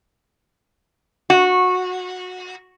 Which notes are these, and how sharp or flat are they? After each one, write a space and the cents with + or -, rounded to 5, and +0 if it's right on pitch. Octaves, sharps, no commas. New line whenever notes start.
F#4 -20